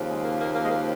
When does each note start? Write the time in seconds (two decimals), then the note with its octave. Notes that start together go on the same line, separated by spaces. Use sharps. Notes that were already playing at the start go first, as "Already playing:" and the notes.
Already playing: D#2 C#3 F3
0.10 G#3
0.24 A#3
0.40 A#3
0.55 A#3
0.65 G#3
0.70 A#3